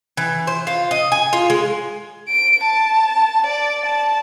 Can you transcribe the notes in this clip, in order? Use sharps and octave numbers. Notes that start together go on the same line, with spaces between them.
E3
C5
F4
D#5
G#5
F4
G#3
D7
A5
D5
A5